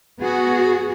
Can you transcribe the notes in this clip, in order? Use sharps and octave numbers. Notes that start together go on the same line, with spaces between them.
B3 F#4 G#4